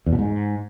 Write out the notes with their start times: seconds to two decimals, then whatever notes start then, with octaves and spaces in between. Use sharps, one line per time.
0.06 E2
0.13 B2
0.19 G#2